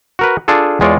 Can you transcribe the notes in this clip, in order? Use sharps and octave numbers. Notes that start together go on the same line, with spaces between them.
F#4 A#4 B4
D4 F4 G#4 A4
E2 G#3 F4 C#5 D5